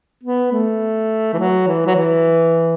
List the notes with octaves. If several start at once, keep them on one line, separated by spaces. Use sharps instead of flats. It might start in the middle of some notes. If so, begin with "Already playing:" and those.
B3
A3
E3
F#3
E3
F#3
E3